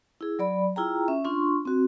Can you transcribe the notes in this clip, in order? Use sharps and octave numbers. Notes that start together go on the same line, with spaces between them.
E4 G#4
F#3 D5 B5
E4 F4 G#4 G5 A#5
C#4 E5
D4 F4 C6 C#6
C4 F#4